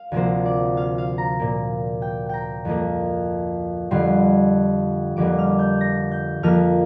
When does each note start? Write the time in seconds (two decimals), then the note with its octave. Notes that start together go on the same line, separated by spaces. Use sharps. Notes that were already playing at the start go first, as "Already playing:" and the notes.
Already playing: F5
0.12 D2 C3 F3 A#3 C5
0.45 D5
0.77 F5
0.98 F5
1.18 A#5
1.39 A#2 A#3
2.02 G5
2.29 G5 A#5
2.65 F2 F3 A#3
3.91 F2 D3 G3 C6
5.17 F2 D3 G3 A#3 D6
5.39 F6
5.59 G6
5.81 A#6
6.12 G6
6.43 F2 F3 A#3 F6